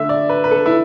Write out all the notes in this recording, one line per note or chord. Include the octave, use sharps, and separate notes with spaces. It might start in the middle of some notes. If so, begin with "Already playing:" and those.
Already playing: D3 A3 E5
D5
B4
B4
A4
E4